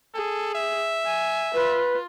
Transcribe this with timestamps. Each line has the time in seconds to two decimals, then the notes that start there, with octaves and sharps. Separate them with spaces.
0.14 G#4 A4
0.55 E5
1.05 G#5
1.54 F4 B4